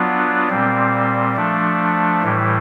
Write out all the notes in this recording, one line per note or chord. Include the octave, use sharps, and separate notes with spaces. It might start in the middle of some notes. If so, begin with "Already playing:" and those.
Already playing: F#3 B3 D4 F4
A#2 G3 C4
F3 A3 D4
A2 E3 G3